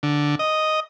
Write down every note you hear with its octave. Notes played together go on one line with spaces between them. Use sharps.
D3
D#5